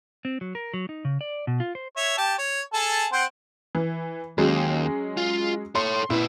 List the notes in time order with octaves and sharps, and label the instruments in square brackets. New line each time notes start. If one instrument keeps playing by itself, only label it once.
[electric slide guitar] C4
F#3
A#4
F#3
D#4
C#3
D5
B2
F4
C5
[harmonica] C#5 E5
G4 A5
C#5
G#4 A4 A5
C4 C5 F#5
[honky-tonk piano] E3
[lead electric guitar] D#2 [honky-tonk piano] F#3 G#3 C#4
[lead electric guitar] F4
[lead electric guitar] A4 C#5 [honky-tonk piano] C6
[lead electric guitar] A#2 B4 [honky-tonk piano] E4